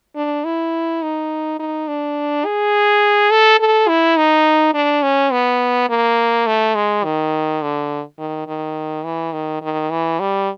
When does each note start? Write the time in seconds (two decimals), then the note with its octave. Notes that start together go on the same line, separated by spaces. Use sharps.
0.16 D4
0.45 E4
1.02 D#4
1.59 D#4
1.88 D4
2.45 G#4
3.31 A4
3.60 A4
3.88 E4
4.17 D#4
4.74 D4
5.03 C#4
5.32 B3
5.90 A#3
6.47 A3
6.75 G#3
7.04 D#3
7.62 D3
8.19 D#3
8.47 D#3
9.05 E3
9.33 D#3
9.62 D#3
9.90 E3
10.19 G3